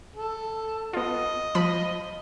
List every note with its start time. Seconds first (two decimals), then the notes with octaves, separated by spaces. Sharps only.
0.16 A4
0.93 B3 F4 D#5
1.55 F3 B5 D#7